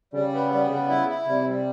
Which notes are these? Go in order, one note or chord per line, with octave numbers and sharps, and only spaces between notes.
C#3 G3
B3
G3
C#3 B3
E4
E4
C3 G3
G3